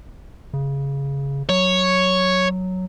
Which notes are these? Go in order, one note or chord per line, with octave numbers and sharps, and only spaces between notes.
C#3
F#3 C#5